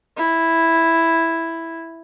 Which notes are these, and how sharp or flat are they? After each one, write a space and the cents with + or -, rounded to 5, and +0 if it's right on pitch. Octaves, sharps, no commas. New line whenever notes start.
E4 +0